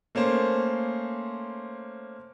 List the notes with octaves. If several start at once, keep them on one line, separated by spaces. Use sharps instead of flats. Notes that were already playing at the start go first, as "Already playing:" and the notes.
A3 A#3 C#4 C5